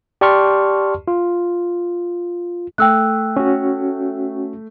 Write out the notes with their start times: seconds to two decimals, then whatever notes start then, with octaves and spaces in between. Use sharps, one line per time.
0.21 G4 D5 A5 C6 C#6 F6
1.08 F4
2.78 A3 G5 E6 F#6
3.37 C#4 F#4